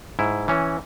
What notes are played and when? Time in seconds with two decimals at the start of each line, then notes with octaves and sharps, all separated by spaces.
0.19 G#2 E4
0.48 E3 C#4